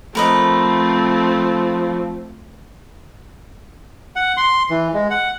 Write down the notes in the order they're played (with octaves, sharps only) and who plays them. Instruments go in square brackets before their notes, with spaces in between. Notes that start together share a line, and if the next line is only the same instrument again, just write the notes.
[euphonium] F3 [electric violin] A3 C4 [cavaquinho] A#4 B4 D#5
[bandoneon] F#5
C6
E3
G#3
F#5